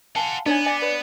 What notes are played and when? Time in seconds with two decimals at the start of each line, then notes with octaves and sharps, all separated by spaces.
0.16 F5 F#5 G#5 A5 C6
0.46 B3 D4 D#4 C#5 D#5 G#5
0.66 D5 G#5
0.82 B4 C#5